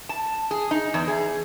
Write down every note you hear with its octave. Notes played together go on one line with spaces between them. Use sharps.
A5
G#4
D#4
E2
G#4